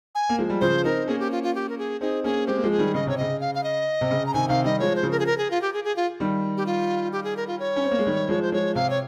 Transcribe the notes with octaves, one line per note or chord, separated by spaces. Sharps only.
G#5
A#3
F3 G#3
G3
C#3 F3 C5
C4 D#4 A#4
A#3 C#4 G#4
G4
F4
F4
G4
A#4
G#4
C4 D#4 G#4
A#3 C#4 G#4
G#3 C4 G4
A#3
F3 G#3
G#4
D#3 G3
C#3 D#5
C3 C#5
C#3 D#5
F5
F5
D#5
C3
C#3
A#5
C3 D#3 G#5
C3 D#3 F5
D#3 G3 D#5
F3 G#3 C#5
C5
C#3 F3
A#4
G#4
A#4
G#4
F4
G4
G#4
G#4
F4
D#3 G3
G4
F4
G4
G#4
A#4
F4
C#5
C#4
C4
A#3
G#3
D#3 G3
F3 G#3
C5
F3 G#3 C#5
C3 F5
C#5